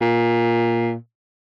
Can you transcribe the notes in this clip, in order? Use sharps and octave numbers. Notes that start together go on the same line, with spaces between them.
A#2